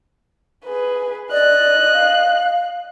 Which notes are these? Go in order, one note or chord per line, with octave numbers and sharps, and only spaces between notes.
G#4 B4
D5 D#5 F#6
F5